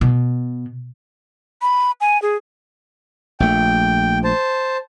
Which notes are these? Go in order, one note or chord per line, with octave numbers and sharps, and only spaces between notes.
B2
B5
G#5
G#4
A#1 A3 G5
C5 A5